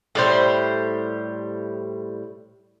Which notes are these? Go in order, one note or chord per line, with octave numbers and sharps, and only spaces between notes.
A2 G3 C5